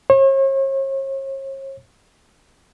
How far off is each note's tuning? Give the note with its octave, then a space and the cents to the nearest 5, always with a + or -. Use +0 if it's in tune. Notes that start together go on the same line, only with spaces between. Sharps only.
C#5 -45